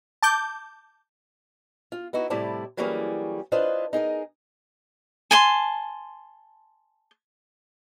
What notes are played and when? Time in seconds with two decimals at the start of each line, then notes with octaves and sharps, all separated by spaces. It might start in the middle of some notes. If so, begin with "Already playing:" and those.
0.23 A5 D6 G6
1.92 F4
2.13 B3 D#4 E4 F#4
2.30 A2 C3 G3 E4 D5 A5
2.77 E3 F#3 G3 A#3 C#4 G#4
3.52 D4 E4 F4 B4 C5 D#5
3.93 D#4 G#4 A#4 D#5
5.31 G#5 A5 C6